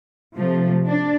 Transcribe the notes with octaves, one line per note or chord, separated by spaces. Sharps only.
C3 F3 A3
D4